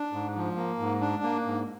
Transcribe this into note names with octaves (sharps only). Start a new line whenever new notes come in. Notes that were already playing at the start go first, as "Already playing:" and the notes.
Already playing: D4
G#2
F3
A#3
G#2
D4
A#3
G#2